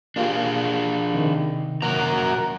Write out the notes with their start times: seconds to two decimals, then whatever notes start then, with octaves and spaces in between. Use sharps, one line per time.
0.16 A#3 D4 F4 G4 G#4 F5
1.14 C3 D#3
1.82 A#2 F#3 A#3 F#4 A#4 A#5